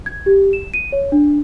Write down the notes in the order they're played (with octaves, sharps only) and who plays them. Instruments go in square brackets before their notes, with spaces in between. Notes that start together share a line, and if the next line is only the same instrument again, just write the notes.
[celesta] G#6
G4
E7
D#7
C#5
D4